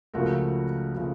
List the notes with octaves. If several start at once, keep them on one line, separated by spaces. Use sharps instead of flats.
C#2 C#3 F3 A3 F#4 A#4
C#3 F3 A3